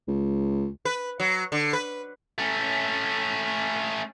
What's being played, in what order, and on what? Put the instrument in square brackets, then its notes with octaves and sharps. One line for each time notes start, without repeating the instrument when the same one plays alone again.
[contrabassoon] C#2
[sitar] B4
F#3
D3
B4
[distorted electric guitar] A3 C#4